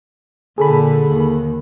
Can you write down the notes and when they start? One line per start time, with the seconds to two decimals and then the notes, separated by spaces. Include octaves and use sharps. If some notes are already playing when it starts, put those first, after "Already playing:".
0.58 A#2 D3 G#4 A4 B5
1.09 D#2